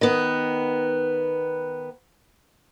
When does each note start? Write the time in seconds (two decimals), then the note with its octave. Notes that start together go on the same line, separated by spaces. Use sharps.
0.01 D#3 B3